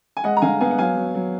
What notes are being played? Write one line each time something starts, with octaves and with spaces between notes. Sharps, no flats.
G#5
G#3 D#5 F#5
A#5
D3 F5 G#5
B3 F5 G#5
F#5
F#3 F5 G#5
F#3
F#3